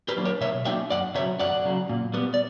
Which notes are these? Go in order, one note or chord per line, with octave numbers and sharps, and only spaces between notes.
G4 B4
F#3 A#3 D4
A#4 C#5
B2 C#5 E5
F#3 A#3 D4 E5 G5
F#2 D5 F#5
C#3 F#3 C#5 E5
F#2 D5 F#5
C#3 F#3
A#2
G3 B3
D5